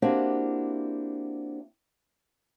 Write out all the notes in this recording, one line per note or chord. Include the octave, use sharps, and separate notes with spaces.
A#3 C4 D4 E4 F#4 G4